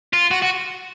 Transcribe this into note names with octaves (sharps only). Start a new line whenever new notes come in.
F4
F#4
F#4